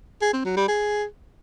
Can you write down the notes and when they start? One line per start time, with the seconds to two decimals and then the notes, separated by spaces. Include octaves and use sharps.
0.22 G#4
0.33 C4
0.45 F#3
0.57 G3
0.68 G#4